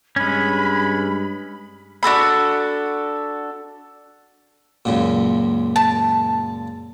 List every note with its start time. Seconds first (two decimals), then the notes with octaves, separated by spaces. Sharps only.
0.16 G2 G#3 C#4 B5
2.03 D4 F#4 A4 B5
4.85 C#2 F#2 A#2
5.76 A5